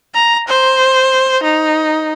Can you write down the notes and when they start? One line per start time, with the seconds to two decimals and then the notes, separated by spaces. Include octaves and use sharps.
0.14 A#5
0.48 C5
1.43 D#4